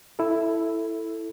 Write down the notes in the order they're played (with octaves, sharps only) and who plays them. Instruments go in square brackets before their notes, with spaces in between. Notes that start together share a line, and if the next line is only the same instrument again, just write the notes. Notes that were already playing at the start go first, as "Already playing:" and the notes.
[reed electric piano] E4 A4